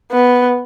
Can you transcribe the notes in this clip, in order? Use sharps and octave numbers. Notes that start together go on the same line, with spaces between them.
B3